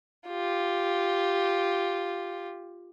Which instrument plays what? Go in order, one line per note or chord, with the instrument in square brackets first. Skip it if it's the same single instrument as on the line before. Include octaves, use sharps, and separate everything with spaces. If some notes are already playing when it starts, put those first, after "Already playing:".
[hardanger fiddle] F4 G4